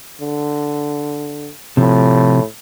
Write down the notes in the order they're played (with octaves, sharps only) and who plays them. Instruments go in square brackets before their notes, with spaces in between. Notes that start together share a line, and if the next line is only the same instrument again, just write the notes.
[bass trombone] D3
[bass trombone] A2 [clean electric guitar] C3 F3